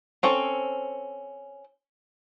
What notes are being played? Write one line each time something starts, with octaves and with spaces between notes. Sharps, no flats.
C4 C#4 A4